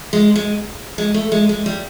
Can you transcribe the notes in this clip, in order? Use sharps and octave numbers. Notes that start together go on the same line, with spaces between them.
G#3
G#3
G#3
A3
G#3
G#3
G3